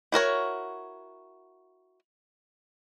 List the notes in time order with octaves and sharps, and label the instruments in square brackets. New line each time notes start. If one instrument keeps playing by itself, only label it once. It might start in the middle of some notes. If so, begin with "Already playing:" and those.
[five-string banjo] E4 F#4 A#4 C#5